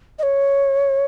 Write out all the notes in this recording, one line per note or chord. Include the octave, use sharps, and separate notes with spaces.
D#5
C#5